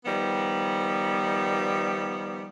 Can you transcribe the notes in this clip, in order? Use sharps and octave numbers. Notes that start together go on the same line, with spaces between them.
D#3 F3 G3 B3